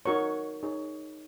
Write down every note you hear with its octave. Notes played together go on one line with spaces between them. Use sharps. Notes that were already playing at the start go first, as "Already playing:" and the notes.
D#4 F#4 A#4 C#5 C#6
D#4 G#4 C#5